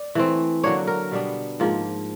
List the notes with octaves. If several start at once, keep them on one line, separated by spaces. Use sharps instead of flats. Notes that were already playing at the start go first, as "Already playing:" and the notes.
Already playing: D5
E3 A3 C4
D3 F#3 A#3 D4 C#5
A#4
B2 G3 B3 D4
G#2 F3 A#3